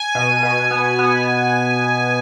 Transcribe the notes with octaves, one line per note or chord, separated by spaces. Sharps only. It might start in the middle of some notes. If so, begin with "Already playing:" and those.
Already playing: G#5
B2
B2
B3
B3